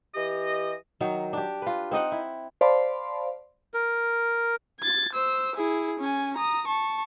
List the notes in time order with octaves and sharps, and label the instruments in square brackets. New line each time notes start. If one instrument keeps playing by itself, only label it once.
[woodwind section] E3 G4 D#5
[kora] D#3 F#3 D#4
D4 G4
F4 B4
C4 D#4 D#5 F#5
E4
[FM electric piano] C5 D5 F5 A5 B5 C6
[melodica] A#4
[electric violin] G#6 A6
C5 E6
E4 G#4
C#4 G#5
A#5 D#6
A5 C#6